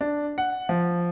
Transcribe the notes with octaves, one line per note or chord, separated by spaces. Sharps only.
D4
F#5
F3